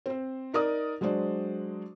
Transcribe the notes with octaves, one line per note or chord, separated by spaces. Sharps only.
C4 C5
D#4 A#4 D5 D#6
F#3 G#3 D4 C5 D5